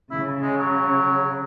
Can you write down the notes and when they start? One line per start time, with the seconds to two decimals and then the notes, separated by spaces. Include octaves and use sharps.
0.11 C#3 E4
0.42 G#3
0.57 F#3